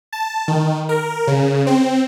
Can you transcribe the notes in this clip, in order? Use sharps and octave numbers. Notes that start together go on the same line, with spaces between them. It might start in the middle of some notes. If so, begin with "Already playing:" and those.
A5
D#3
A#4
C#3
C4